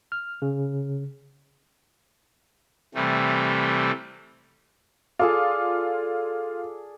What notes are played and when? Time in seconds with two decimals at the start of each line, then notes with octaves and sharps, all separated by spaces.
0.12 F6
0.42 C#3
2.95 C3 E3 G3 A3
5.19 F4 G#4 A4 D5